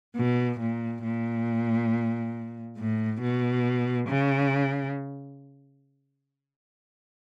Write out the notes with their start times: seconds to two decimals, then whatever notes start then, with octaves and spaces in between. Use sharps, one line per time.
0.16 B2
0.60 A#2
1.03 A#2
2.77 A2
3.21 B2
4.08 C#3